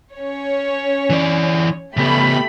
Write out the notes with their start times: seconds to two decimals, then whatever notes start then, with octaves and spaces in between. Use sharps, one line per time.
0.15 C#4 C#5
1.10 E3 D5
1.97 C#3 A3 B3 G4 B5